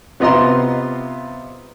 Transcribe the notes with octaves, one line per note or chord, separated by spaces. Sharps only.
C3 B3 F4 D#5 A#5 C6